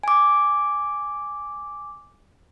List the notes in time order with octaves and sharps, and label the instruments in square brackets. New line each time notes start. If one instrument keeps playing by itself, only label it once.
[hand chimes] G#5 D6